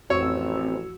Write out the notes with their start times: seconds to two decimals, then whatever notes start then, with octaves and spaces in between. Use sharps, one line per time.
0.10 A1 F2 C4 F#4 C#5 E6